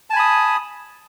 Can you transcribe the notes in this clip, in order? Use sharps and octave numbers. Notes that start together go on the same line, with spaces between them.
G#5 A5 B5 D#6